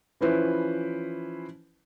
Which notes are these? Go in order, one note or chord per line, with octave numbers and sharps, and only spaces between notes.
E3 F3 C#4 E4 B4 C5